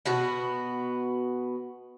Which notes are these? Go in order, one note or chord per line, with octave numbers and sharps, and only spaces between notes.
B2 B3 F#4